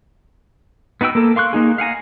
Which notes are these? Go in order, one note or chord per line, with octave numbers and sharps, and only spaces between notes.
B3 D#4 F#4 G5 E6
A#3 A4
F5 C6 C#6 F#6
A#3 D#4 G#4
F5 F#5 G#5 A#5